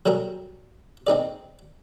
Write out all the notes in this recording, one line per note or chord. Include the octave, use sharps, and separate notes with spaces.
F#3 G3 G#4 A#4
C4 D#4 G#4 D5